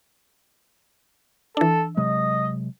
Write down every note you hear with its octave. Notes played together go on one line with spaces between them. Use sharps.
E3 D4 A4
C3 F#3 G#3 D#5